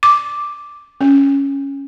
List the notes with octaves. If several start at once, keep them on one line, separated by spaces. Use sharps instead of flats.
D6
C#4